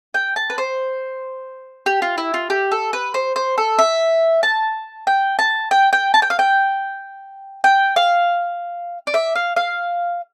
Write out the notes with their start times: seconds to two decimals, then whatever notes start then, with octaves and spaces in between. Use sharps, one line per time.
0.14 G5
0.36 A5
0.50 B4
0.58 C5
1.86 G4
2.02 F4
2.18 E4
2.34 F4
2.50 G4
2.72 A4
2.93 B4
3.14 C5
3.36 C5
3.58 A4
3.79 E5
4.43 A5
5.07 G5
5.39 A5
5.71 G5
5.93 G5
6.14 A5
6.22 G5
6.30 F5
6.39 G5
7.64 G5
7.96 F5
9.07 D5
9.14 E5
9.35 F5
9.56 F5